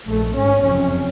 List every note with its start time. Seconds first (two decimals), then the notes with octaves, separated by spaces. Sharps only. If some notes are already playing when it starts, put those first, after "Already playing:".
0.08 A#1 G#2 A3
0.36 G#1 G#2 C#4
0.64 F#1 F2 C3 C#4